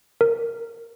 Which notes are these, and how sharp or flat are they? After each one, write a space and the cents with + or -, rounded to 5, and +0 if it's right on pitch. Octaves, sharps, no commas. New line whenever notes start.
A#4 -10